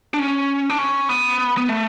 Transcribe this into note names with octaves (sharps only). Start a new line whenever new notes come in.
D4
C#4
D4
C#4
B3
B3
A3